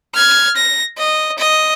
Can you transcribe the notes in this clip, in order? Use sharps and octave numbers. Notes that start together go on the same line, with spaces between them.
F6 G#6
A#6
D#5
D#5